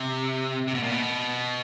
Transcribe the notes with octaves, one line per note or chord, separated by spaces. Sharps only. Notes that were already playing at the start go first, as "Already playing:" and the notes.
Already playing: C3
C3
B2
A#2
B2